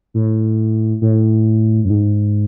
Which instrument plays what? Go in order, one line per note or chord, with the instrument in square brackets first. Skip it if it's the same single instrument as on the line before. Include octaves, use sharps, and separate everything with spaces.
[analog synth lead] A2
A2
F#2
G#2